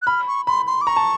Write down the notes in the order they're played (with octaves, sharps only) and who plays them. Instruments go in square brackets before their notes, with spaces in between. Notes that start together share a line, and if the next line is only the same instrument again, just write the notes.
[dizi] F#6
[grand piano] B5 [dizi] F6
[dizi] C#6
[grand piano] B5 [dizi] C6
[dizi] C6
D6
[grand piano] A#5 [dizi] C#6
[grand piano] A5